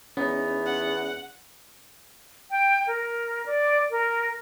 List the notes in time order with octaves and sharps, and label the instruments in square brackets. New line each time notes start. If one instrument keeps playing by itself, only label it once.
[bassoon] E2 [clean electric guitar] B3 D#4 [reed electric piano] C#4
[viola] F#5
[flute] G5
A#4
D5
A#4